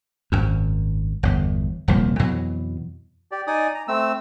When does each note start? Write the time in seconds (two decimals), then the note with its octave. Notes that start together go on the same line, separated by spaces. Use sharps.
0.32 G#1 F#2
1.23 G1 E2
1.88 D#1 C2 F3 A#3
2.19 F2 B2 E3 F#3
3.32 G4 D5
3.47 D#4 D5 G#5 D#6
3.74 A#5
3.88 A3 C4 E6